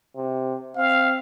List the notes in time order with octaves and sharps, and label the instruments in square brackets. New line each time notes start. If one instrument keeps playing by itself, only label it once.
[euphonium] C3
[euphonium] C4 [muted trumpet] F5